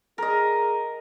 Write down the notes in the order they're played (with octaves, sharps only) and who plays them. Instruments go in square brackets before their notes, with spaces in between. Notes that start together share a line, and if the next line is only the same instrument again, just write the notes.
[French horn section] G#4 [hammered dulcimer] A#4 D#5